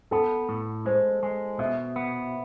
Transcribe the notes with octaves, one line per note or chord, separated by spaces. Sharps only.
B3 A4
A2
G#3 C5
G#3
B2 E5
B3